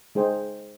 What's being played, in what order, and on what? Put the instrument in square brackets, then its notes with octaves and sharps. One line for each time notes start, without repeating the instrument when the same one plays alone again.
[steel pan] G#3 D#4 G#4 C5 G5